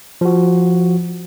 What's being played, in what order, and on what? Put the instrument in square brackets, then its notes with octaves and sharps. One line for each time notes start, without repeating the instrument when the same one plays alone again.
[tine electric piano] F3 F#4